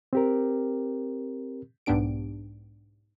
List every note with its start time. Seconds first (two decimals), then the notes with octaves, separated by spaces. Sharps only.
0.13 C4 G4 A#4
1.86 B1 G#2 B3 D4 G4 D7